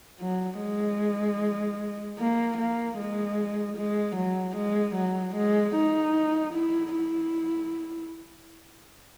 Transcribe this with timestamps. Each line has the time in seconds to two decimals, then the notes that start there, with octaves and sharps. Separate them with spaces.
0.21 F#3
0.61 G#3
2.19 A#3
2.58 A#3
2.98 G#3
3.78 G#3
4.16 F#3
4.56 G#3
4.96 F#3
5.35 G#3
5.75 D#4
6.53 E4
6.94 E4